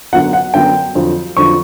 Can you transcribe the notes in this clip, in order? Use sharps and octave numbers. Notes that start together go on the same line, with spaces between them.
F#2 D3 F#3 B3 F#5
F#5
F#2 D3 F#3 B3 G5
F2 D3 F#3
F2 D3 F#3 C#6